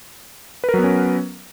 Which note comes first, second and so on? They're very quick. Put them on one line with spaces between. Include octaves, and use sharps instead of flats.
B4 A#4 F#3 B3 C#4